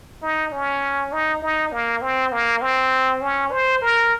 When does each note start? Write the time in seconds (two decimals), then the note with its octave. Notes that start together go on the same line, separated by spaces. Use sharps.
0.23 D#4
0.52 C#4
1.12 D#4
1.42 D#4
1.72 A#3
2.02 C4
2.32 A#3
2.62 C4
3.21 C#4
3.52 C5
3.82 A#4